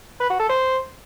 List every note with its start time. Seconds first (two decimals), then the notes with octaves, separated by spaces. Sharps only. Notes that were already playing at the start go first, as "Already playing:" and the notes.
0.20 B4
0.30 F#4
0.39 A4
0.49 C5